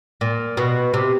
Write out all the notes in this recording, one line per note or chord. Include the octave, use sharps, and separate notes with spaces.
A#2
B2
C3